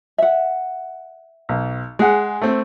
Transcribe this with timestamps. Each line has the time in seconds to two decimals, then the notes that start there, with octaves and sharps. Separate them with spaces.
0.18 E5 F#5
1.49 B1
1.99 G#3 G#4 F#5
2.41 A3 C4